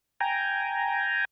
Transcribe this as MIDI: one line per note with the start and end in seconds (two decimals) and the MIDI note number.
0.21 1.25 79
0.21 1.25 80
0.21 1.25 82